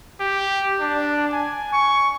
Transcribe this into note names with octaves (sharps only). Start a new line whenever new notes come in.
G4
D4
G#5
C#6